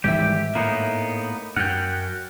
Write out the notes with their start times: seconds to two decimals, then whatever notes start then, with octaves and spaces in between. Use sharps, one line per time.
0.04 G#1 G#2 E3 G3 G4 E5
0.55 A2 A#3 B3 D#4
1.57 F#2 F#5 G5 F6 F#6